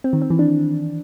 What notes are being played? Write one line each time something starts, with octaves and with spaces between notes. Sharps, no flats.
C4
D#3
C4
E3
D4